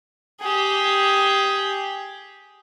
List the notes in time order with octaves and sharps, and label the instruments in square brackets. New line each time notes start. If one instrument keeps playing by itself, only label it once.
[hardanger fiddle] G4 G#4